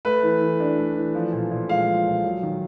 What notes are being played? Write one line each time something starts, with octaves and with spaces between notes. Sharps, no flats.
A3 B4
E3
E3
D4
A3
E3
F3
A#2
A#2
G#3 F5
F3
A#2
F#3
D#3